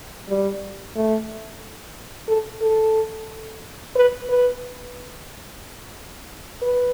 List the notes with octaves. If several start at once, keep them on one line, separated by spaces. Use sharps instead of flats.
G3
A3
A4
A4
B4
B4
B4